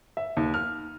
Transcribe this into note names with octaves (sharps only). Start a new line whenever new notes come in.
E5
D#2
F6